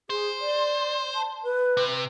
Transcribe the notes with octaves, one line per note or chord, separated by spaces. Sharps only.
G#4 C5
D5
A5
B4
C3